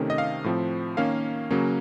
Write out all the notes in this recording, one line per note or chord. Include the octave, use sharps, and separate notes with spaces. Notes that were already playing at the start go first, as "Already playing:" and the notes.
Already playing: C3 D#3 A3 C#4
D#5
F5
A2 F3 C4
D#3 A#3 C#4 F5
C#3 F#3 A#3 C#4